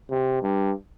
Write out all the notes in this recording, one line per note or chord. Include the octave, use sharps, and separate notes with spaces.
C3
G2